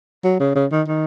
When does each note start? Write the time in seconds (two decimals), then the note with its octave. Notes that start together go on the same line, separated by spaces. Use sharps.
0.24 F#3
0.40 C#3
0.55 C#3
0.72 D#3
0.88 D#3